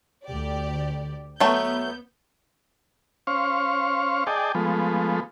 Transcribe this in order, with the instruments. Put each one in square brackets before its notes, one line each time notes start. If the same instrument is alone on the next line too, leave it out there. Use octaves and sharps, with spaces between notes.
[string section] D2 G4 D5
[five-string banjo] F#3 A3 [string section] B3 G6
[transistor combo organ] C#4 C5 F5 C#6
G#4 D5 D#5 G5 A5
F3 G#3 A3 B3